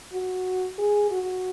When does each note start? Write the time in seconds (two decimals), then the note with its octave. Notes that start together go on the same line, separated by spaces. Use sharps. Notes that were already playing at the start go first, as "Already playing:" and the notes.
0.13 F#4
0.78 G#4
1.11 F#4